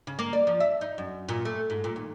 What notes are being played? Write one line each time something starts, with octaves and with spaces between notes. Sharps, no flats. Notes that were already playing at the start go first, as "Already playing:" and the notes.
C#3
A#3
D5
F3
E5
D#4
F#2
A#2
A3
G#2
A#2
D#2